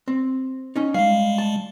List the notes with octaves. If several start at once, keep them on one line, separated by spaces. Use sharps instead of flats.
C4
C#4 D#4
G3 G#3 F5
A5